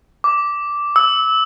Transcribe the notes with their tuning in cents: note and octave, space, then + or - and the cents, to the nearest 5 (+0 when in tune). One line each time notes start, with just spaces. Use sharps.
D6 -5
E6 -25